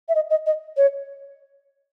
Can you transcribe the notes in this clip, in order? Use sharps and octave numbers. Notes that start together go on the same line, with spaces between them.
E5
D#5
D#5
D#5
C#5